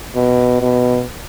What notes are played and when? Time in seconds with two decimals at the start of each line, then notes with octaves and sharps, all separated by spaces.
0.15 B2
0.62 B2